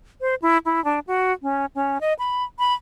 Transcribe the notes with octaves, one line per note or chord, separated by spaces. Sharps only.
C5
E4
E4
D4
F#4
C#4
C#4
D#5
B5
B5